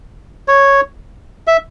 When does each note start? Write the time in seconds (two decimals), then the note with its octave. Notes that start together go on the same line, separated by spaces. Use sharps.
0.48 C#5
1.47 E5